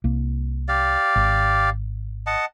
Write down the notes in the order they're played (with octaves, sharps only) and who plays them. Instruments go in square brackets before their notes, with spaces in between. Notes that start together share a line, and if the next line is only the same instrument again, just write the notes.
[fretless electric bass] C2 A#3
[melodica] G4 D5 F5
[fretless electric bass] G#1
[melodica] D#5 F#5 A5